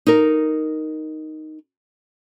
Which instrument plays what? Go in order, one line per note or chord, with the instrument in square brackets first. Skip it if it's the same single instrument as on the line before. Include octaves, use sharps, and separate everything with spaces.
[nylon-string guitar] D#4 A#4